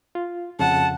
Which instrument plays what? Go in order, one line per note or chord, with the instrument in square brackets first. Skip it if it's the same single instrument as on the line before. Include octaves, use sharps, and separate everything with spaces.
[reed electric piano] F4
[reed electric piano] F2 C#3 [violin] F#5 [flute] A5